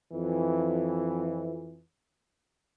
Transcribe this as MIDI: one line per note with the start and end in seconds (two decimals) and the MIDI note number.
0.12 1.83 41
0.12 1.83 52